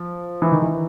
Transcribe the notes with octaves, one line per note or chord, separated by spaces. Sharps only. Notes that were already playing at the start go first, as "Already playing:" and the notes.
Already playing: F3
E3
D#3
E3